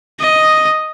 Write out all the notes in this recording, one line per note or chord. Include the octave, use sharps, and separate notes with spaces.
D#5